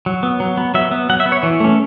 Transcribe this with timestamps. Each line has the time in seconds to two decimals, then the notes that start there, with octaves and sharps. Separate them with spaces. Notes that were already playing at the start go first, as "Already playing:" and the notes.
0.06 F#3
0.23 B3
0.40 F#3
0.57 B3
0.74 F#3 E5
0.91 B3
1.09 F#3 F#5
1.20 E5
1.26 B3
1.32 C#5
1.43 E3
1.60 A3 C#4